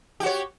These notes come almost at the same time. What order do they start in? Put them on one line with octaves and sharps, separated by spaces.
G4 F#4 C#5